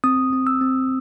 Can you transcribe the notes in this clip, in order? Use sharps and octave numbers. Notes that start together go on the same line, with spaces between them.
C4 D#6
C4
E6
C4